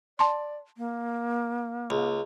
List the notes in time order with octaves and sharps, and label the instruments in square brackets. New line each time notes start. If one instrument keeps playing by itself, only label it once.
[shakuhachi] D5 [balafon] A5 C6
[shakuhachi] A#3
[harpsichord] C#2